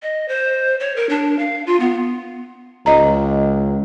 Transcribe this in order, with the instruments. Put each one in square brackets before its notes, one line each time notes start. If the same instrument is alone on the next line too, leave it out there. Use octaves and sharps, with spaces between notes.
[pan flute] D#5
C5
C#5
A#4
D4
F5
F4
B3
[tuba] C#2 [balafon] D#5 A#5